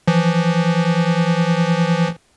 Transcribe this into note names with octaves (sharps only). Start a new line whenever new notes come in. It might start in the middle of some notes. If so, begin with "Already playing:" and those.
E3 F3